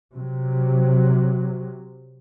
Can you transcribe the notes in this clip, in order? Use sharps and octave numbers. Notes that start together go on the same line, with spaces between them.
C3 F#3